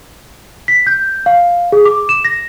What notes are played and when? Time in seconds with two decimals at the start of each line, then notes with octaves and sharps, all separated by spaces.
0.68 B6
0.87 G6
1.26 F5
1.72 G#4
1.85 D6
2.09 E7
2.25 A#6